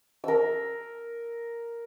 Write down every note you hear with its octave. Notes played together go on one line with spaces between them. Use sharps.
A#4 E6